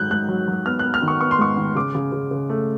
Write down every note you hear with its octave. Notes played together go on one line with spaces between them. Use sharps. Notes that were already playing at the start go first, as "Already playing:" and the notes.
Already playing: G#2 D#3 F#3 F#6 G6
G#2 F#6
F#3
F#3
B3 F6
F#6
B3
F6
D#3
C#6
B3 C#6
C6
G#2 C#6
D#3
C#3 D6
C#3
C#3
C#3
A3